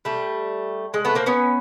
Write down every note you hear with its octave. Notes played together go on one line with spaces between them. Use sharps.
G3 A3
G#3
A3 B3
A#3 C4
B3 C#4